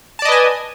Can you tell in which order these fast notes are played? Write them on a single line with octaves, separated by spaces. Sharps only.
A5 D5 D#5 B4 G#5